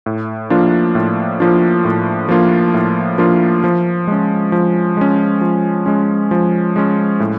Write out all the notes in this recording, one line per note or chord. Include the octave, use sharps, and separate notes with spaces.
A2
F3 A#3 D4 F4
A2
F3 A#3 D4 F4
A2
F3 A#3 D4 F4
A2
F3 A#3 D4 F4
F3
G#3 C#4
F3
G#3 C#4
F3
G#3 C#4
F3
G#3 C#4
A2